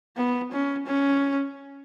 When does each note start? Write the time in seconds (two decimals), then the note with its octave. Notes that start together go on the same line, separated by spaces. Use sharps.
0.17 B3
0.52 C#4
0.87 C#4